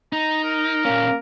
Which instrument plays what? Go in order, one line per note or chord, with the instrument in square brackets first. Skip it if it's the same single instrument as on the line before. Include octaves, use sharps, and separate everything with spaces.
[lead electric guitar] D#4 [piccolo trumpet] A#5
[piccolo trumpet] A#4
[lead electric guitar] A#2 C#4 [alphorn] A#3